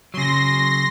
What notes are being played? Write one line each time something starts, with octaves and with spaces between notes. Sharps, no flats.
C#3 F#3 C6 A#6